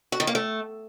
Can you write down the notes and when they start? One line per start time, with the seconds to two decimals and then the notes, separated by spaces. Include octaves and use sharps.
0.12 F#4
0.20 D#3
0.27 A#3
0.35 A3